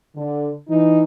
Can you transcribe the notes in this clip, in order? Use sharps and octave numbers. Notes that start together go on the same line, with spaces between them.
D3
E3 D#4